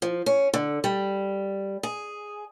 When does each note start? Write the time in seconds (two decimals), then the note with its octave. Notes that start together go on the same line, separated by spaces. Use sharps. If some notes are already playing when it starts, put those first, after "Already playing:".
0.02 F3
0.26 C#4
0.54 D3
0.84 G3
1.83 G#4